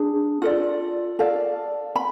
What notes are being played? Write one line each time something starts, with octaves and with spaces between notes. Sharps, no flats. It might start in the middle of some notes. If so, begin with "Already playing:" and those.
Already playing: D4 G#4
F4 A4 D5
A4 D5 F5
B5